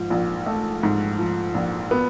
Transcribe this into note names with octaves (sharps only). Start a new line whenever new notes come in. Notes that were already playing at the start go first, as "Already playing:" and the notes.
Already playing: G#2 F3
A#1
A3
G#2
F3
A#1
B3